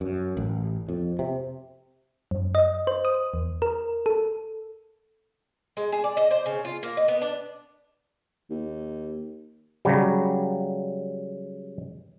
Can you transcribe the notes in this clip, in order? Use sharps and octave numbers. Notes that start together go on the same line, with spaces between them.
F#2
A1
F2
C3
F#2
D#5
C5
D#6
E2
A#4
A4
G#3
G#4
D5
D#5
C5
C#3
F4
A#3
D#5
B3
D4
D#2
C#3 F#3 G3